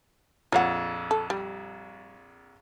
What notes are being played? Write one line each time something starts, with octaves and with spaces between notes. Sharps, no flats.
A#1 F2 F4 C#5 F#5
A4
G3